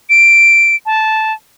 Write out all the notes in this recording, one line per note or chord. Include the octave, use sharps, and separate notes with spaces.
D7
A5